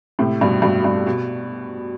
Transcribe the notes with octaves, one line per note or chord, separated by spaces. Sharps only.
A2 C3
G2 B2
G2 B2
G2
B2